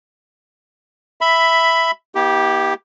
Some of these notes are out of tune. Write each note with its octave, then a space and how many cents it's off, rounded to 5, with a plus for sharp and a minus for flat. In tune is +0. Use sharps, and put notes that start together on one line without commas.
E5 +0 B5 +10
B3 -45 E4 -45 G4 +0